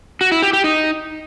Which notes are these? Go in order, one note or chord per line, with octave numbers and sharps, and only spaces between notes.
F#4
E4
G4
G4
D#4